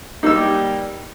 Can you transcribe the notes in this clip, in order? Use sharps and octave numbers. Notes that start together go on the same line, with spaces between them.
G3 A#3 D#4 E6